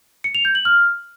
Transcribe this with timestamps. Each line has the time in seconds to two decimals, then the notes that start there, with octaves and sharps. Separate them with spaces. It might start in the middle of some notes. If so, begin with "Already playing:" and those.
0.24 C#7
0.35 F7
0.45 G6
0.55 F#7
0.65 F6